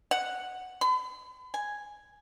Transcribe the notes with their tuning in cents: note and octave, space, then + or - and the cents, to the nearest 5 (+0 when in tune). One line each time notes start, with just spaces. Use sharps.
F#5 +0
B5 +40
G#5 -5